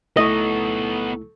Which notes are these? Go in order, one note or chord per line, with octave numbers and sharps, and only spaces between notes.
C#2 A3 B3 D#4 E4 A4 D#5 C#6